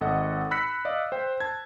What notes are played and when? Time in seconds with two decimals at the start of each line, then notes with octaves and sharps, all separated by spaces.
0.01 G#1 A4 D#5 F#5
0.51 B5 E6 F#6 A#6 B6 C#7
0.85 D5 D#5 F5
1.12 C5 G5
1.40 A5 G#6